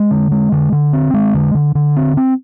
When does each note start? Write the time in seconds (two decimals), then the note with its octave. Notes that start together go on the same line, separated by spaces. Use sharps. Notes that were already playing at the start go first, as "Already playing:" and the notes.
Already playing: G#3
0.11 D3
0.32 G#3
0.52 D3
0.72 D3
0.93 C4
1.14 G#3
1.34 D3
1.55 D3
1.75 D3
1.96 C4
2.17 C4